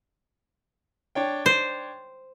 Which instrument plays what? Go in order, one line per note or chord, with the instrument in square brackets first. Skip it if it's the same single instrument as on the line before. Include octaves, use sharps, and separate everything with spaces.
[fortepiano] D4 C#5 G5
[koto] C5